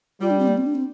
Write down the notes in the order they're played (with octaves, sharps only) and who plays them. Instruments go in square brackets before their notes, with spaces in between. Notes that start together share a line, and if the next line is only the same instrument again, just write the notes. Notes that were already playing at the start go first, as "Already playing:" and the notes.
[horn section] G3 [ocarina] F4
[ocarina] D4
C4
A#3
C4
D4
C4